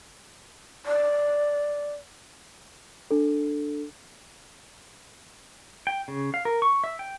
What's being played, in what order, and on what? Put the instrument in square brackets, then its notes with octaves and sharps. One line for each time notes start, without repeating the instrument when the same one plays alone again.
[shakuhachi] D5
[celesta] D4 A4
[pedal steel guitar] G5
C#3
F5
A#4
C#6
E5
G5